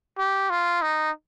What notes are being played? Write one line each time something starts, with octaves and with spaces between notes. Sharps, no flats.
G4
F4
D#4